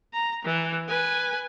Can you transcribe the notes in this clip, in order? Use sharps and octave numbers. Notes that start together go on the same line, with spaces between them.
A#5
E3
B4 G#5